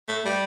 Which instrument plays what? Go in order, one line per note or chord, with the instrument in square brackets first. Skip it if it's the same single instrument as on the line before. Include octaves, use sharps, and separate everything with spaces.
[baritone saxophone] A3
G3